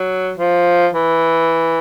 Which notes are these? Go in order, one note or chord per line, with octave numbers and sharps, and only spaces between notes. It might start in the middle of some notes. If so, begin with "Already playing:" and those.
Already playing: F#3
F3
E3